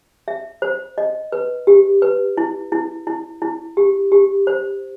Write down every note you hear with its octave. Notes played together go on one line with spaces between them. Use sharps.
E5
C5
D#5
B4
G4
B4
E4
E4
E4
E4
G4
G4
C5